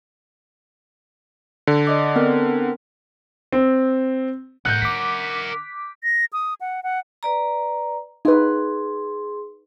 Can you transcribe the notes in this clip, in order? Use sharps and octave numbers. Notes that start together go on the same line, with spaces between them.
D3
D5 D#5 D6
B3 C4 A#4
C4
A2 A#4 F#5 F#6 G6
D3 D6 B6
A#6
D#6
F#5
F#5
B4 D5 A#5
D#4 G#4 B4 C6